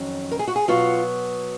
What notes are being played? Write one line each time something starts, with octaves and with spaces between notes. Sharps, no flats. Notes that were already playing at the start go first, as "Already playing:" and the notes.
Already playing: F2 D#3 F#3 C#4
A#4
G#4
F#4
G#4
B2 F#3 B3 F4 F#4